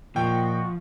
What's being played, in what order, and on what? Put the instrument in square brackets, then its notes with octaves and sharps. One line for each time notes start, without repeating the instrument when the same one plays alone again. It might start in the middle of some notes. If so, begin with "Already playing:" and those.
[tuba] A#2 [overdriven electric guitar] F3 [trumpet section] F#4 D#5 C#6 [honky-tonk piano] G5